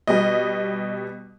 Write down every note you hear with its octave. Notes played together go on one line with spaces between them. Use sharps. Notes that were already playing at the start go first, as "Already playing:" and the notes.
B2 G3 D#5